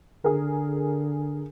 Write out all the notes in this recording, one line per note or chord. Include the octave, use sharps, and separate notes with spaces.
D3 G#4 A#4